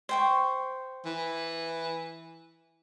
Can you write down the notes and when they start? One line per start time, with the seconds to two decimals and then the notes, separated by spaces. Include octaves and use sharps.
0.09 C5 G5 C#6
1.06 E3